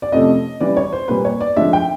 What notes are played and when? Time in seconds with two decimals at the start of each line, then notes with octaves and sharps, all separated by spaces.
0.02 D5
0.12 F2 C3 F3 A3 C#4 D#5
0.61 C#3 E3 G3 D5
0.77 C#5
0.93 C5
1.08 A#2 G3 A#3 B4
1.25 C#5
1.41 D5
1.57 D3 F3 G#3 E5
1.73 G5